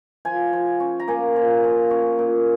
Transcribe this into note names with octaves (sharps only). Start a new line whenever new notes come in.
F3 G#5
F3
C#4
A#5
A#3 G#5
F3
F3
C#4
A#2